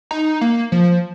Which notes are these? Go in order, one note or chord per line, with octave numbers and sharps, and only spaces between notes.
D#4
A#3
F3